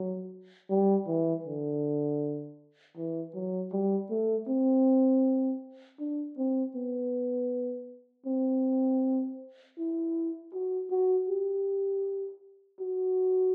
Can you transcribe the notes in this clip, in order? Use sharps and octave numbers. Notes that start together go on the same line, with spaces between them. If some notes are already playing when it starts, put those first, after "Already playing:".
Already playing: F#3
G3
E3
D3
E3
F#3
G3
A3
C4
D4
C4
B3
C4
E4
F#4
F#4
G4
F#4